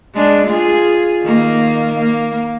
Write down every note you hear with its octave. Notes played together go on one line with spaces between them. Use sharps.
G#3 D4
F4 G#4
D#3 A#3
A#3